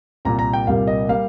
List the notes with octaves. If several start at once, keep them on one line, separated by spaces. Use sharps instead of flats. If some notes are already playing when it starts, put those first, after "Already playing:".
C2 A#2 G3 A#3 A#5
A#5
G5
C2 A#2 G3 A#3 F5
D#5
G3 A#3 F5